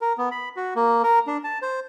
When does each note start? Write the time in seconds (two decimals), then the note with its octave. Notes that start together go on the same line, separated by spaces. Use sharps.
0.01 A#4
0.18 B3
0.31 B5
0.57 F#4
0.76 A#3
1.04 A#4
1.27 D4
1.44 A5
1.62 C5